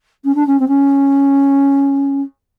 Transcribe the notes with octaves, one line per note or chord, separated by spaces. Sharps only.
C#4
D4
C#4
C4
C#4